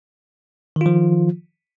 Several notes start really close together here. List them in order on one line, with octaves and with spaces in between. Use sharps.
D#3 F4 F3